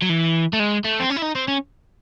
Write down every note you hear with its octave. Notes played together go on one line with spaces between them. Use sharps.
F#3
E3
A3
G#3
A3
C4
C#4
E4
D#4
C4
C#4